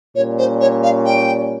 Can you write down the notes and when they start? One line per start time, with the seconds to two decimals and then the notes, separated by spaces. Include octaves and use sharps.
0.15 A#2 G3 C#4 C#5
0.38 C5
0.60 C#5
0.83 F5
1.05 G5